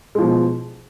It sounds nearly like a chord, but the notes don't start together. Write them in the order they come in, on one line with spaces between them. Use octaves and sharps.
G#3 F3 B2